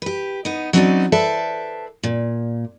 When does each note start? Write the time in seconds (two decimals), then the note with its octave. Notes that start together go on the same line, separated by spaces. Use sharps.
0.02 G4 B4
0.45 B3 D#4
0.73 F#3 C4 C#4 D#4 E4 D5
1.12 A4 B4 C5 D5 E5 A5
2.03 A#2